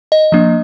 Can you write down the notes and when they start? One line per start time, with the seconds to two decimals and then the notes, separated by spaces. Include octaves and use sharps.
0.12 D#5
0.32 F3 A#3 D4